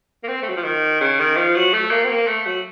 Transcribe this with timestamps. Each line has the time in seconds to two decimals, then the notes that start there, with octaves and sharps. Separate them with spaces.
0.24 A#3
0.28 C4
0.42 A3
0.49 F#3
0.57 F3
0.64 D#3
1.01 C#3
1.19 D#3
1.37 F3
1.56 F#3
1.74 A3
1.91 A#3
2.04 C4
2.09 A#3
2.27 A3
2.46 F#3